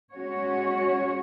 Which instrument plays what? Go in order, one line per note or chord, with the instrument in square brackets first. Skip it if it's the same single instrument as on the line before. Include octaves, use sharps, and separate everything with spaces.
[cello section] G#3 C#4 F#4 C#5